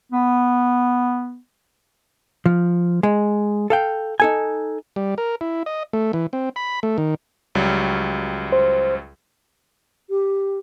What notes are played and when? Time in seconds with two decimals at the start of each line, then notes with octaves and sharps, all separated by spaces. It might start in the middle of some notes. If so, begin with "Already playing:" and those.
0.12 B3
2.46 F3
3.03 G#3
3.70 A4 F5 G5
4.20 D#4 A4 G#5
4.96 G3
5.18 A#4
5.41 E4
5.66 D#5
5.93 A3
6.13 E3
6.33 C4
6.56 B5
6.83 A3
6.98 D#3
7.55 C#2 F#3 G3
8.52 C5
10.10 G4